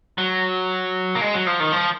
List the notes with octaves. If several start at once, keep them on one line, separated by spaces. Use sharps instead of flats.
F#3
A#3
G#3
F#3
F3
D#3
F3